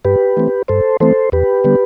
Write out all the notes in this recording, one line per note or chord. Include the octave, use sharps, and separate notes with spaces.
G2 G4 B4
E3 A3 C4
G2 A4 C5
E3 A3 C4 A4 C5
E2 G4 B4
D3 G3 B3